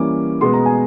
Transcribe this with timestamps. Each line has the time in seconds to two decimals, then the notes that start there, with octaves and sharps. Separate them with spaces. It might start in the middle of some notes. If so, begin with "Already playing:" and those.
Already playing: E3 G3 A#3 C#4 D6
0.41 B2 G#3 B3 C6
0.53 A#5
0.66 G#5